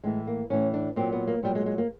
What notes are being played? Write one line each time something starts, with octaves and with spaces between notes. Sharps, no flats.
A2 E3 G#3
A#3
A2 E3 C#4
D4
A#2 F#3 C4
B3
A#3
A#2 F#3 G3
G#3
G#3
A#3